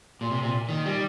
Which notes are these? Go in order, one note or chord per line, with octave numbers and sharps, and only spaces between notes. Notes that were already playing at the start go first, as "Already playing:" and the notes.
A#2
C3
A#2
D#3
G3